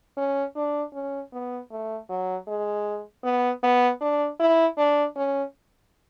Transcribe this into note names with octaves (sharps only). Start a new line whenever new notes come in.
C#4
D4
C#4
B3
A3
F#3
G#3
B3
B3
D4
E4
D4
C#4